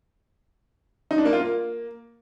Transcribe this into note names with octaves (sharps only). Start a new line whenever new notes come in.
D#4
D4
A#3
F4
A#3